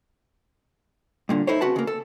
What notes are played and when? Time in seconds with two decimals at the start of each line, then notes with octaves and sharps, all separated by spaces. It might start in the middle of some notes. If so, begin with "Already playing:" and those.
1.29 G2 A#2 D3
1.47 D#4 E4 A4 C5 C#5
1.61 C#3 C4 F#4 B4 F#5 A5
1.76 C#3 A#3
1.87 A4